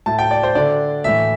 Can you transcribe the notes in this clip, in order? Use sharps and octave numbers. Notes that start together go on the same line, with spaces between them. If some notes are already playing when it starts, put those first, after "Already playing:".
A2 A3 E4 A5
G5
D5
C5
D3 A3 D4 D5
A2 E3 A3 E5